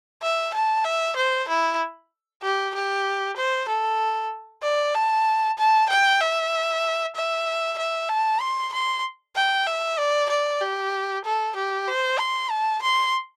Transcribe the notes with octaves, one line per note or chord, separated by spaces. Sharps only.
E5
A5
E5
C5
E4
G4
G4
C5
A4
D5
A5
A5
G5
E5
E5
E5
A5
C6
C6
G5
E5
D5
D5
G4
A4
G4
C5
C6
A5
C6